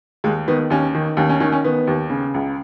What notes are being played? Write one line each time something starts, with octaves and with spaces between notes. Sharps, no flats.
D#2 G#3
D#3 B3
D#2 C#4
D#3
D#2 C#4
C#4
D#3 C#4
C#4
D#3 B3
D#2
C#3
C#2